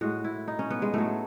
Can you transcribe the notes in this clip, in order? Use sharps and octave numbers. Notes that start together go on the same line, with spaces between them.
A2 G#3 F#4
E4
D#4
C#4
B3
G#3
A2 F#3 A3